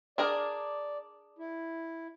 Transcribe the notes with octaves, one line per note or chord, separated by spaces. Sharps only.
D4 G#4 A#4 D5
E4